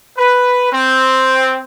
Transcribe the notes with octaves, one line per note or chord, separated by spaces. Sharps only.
B4
C4